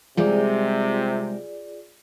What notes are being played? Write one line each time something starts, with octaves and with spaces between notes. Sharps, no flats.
C3 G3 G#3 D#4 F4 G#4 D5